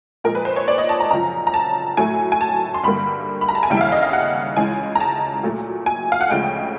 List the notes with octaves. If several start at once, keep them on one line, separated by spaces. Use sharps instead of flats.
A#2 F3 G#3 A#4
B4
C5
C#5
D5
D#5
A5
A#5
F#2 C#3 F3 A#5
A#5
A5
A2 F#3 A3 G#5
G#5
A5
C6
G2 D3 G3 A#3 B5
B5
A#5
A5
G#5
D#2 C#3 E3 G3 G5
E5
F5
D#5
F5
F#5
C#2 C#3 E3 G#3 G#5
A#5
A5
A#2 F#3 A3
G#5
F5
F#5
D2 C#3 F3 G#3 G5